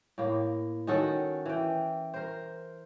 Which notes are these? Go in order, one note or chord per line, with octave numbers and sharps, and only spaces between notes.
A2 A#3
D#3 C#4 F#4 A4
E3 G5
A#4 C5